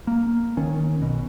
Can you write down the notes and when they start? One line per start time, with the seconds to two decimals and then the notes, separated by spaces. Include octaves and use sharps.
0.07 A#3
0.57 D#3 C#4
1.00 B1 B2